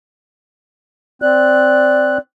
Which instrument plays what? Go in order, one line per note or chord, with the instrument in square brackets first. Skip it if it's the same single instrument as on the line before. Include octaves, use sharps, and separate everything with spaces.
[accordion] C4 F#6 [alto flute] D5